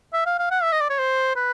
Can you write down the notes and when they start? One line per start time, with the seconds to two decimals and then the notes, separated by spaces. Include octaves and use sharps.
0.13 E5
0.26 F5
0.39 F5
0.51 F#5
0.63 E5
0.72 D#5
0.81 D5
0.89 C#5
0.99 C5
1.36 B4